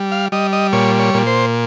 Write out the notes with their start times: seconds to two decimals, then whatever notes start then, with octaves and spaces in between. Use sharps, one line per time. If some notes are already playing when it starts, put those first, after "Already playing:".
Already playing: G3
0.12 F5
0.32 G3 D#5
0.53 D#5
0.73 A#2 C#5
0.99 C#5
1.14 A#2
1.27 C5